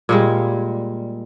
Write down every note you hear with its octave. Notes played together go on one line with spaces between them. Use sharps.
A#2 G3 G#3